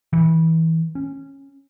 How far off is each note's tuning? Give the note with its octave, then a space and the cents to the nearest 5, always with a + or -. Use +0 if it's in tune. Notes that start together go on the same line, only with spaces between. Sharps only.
E3 -25
C#4 -15